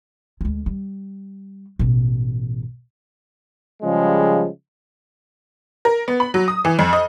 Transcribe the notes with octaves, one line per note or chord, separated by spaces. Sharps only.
D2 G#3
G3
A1 B2
C#3 F3 G3 G#3
A#4
B3
B5
F#3
D#6
E3
F2
D#5